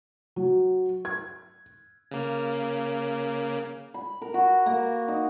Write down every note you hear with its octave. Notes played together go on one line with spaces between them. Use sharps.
F#3
G#6
C#3 A#3
B5
A#4
F#4
A#3
D#4